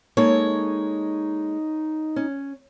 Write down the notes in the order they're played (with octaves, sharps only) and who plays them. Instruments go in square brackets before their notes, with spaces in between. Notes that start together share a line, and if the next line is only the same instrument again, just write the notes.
[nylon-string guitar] G#3 A#3 A4 [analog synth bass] D#4 [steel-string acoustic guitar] C#5
[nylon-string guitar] C#4